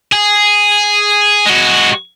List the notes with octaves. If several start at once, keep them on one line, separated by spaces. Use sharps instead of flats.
G#4
G#3 F#4